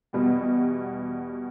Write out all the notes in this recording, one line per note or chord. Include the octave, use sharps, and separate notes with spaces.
E2 B2 G3